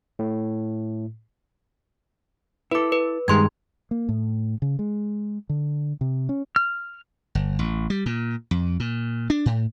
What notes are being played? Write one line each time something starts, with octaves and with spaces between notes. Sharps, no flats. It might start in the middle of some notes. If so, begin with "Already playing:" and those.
A2
E4 A4 B4 D6
B4
G2 D#3 G#3 C6 G#6
A#3
A2
C#3
G#3
D3
C3
C#4
F6
G1
A1
G3
A#2
F2
A#2
D4
A2